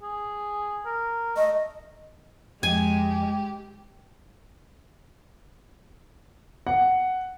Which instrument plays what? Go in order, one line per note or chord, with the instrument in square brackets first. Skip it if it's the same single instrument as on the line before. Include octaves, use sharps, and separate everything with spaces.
[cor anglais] G#4
A#4
[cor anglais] A3 [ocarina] D#5
[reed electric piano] F2 [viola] G#3 [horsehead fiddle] G4 [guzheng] G#5
[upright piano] F#5